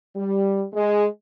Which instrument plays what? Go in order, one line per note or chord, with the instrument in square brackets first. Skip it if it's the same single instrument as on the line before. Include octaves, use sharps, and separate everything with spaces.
[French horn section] G3
G#3